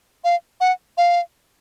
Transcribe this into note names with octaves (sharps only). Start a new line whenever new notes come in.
F5
F#5
F5